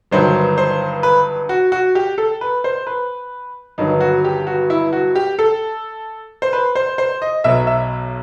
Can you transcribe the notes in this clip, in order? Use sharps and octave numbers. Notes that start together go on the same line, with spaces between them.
G1 G2 D#3 F#3 C5
C5
B4
F#4
F#4
G4
A4
B4
C5
B4
G1 G2 D#3 F#3 D#4
F#4
G4
F#4
E4
F#4
G4
A4
C5
B4
C5
C5
D#5
B1 B2 F#3 E5
E5